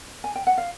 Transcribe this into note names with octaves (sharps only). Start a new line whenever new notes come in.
G#5
G5
F#5
F5